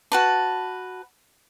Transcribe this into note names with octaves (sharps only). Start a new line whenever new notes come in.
F#4 B4 A5